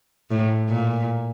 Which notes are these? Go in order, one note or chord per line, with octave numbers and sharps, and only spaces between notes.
A2
A#2